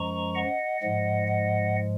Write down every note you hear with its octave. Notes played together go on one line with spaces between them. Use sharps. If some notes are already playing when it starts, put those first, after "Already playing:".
Already playing: F#2 F3 G#3 A#5 C#6
D#5 F#5
G#2 F3 G#3 D#5 F#5
D#5 F#5